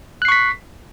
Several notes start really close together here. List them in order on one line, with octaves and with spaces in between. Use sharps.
F#6 C7 C#6 B6